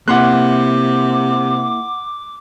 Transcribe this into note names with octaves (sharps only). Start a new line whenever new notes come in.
C3 A#3 E4 F#5 C6 D6 F#6